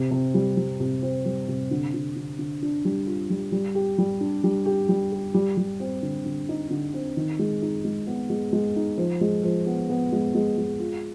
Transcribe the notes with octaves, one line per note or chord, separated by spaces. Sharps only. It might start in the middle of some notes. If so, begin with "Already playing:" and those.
Already playing: C3
C3
G3
G3
C3
C4
G3
C3
D3
D3
D3
D3
D4
G3
F4
G3
G3
G4
G3
D4
G3
G4
G3
G4
G3
G3
C4
D3
D3
D#4
D3
C4
D#3
G#3
D#4
G#3
B3
G#3
G#3
D#4
F3
G#3
F3
B3
B3
G#3
G#3
G#3
F4